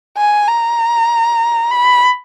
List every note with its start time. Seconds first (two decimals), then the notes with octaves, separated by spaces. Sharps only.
0.18 G#5
0.48 A#5
1.71 B5